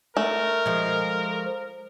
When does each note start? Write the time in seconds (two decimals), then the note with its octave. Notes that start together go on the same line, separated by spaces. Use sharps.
0.17 A3 A#4
0.66 F3 G#3